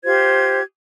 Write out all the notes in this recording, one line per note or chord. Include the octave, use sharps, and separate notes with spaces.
F4 G4 C5 G#6